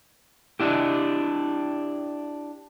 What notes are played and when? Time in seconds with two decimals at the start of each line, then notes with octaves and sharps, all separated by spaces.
0.60 D4 E4 G4